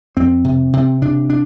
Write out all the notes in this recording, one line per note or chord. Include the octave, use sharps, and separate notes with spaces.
F2 C4
C3
C3 C4
C3 D4
D4